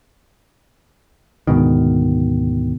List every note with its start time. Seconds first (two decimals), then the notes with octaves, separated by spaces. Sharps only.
1.47 D2 G#2 B2 D#3